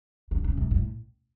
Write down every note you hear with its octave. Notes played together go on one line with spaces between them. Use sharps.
D3
C#3
C3
A2